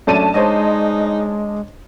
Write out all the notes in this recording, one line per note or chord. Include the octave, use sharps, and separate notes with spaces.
F#2 A3 C#4 D4 A5 D#7
G#3 D#4 C5 C#5 D#5